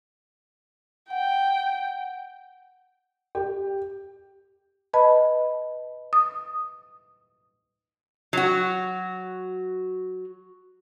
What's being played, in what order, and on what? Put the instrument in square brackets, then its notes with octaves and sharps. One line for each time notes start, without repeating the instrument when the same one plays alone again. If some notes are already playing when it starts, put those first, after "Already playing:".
[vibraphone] F#5 [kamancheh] G5
[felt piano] G4
[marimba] B4 D#5 A5 B5
D#6
[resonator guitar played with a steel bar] F#3 F#4